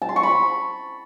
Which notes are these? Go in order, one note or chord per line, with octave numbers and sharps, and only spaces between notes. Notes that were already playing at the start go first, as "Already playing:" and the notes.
A5
C6
C#6
B5